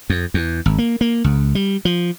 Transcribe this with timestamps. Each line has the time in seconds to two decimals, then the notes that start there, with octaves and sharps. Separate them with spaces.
0.10 F2
0.34 E2
0.66 G#1
0.78 A#3
1.01 A#3
1.24 C#2
1.55 G3
1.85 F3